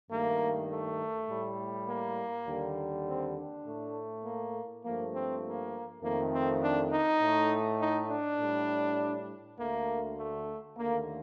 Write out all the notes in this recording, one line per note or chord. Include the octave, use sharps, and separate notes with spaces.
G2 D#3 A3 A#3
A3
A2 G3
A#3
D#2 D3 G3
C4
D4
A2 A3
A#3
G2 F3 A3 A#3
C4
A#3
F2 D#3 A3 A#3
C4
D4
D#4
A2 A3
D#4
D4
A2 G3
D2 D3 A3 A#3
A3
D#2 D3 A3 A#3